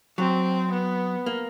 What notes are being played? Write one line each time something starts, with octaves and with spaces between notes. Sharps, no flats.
F#3 C4
B3
A#3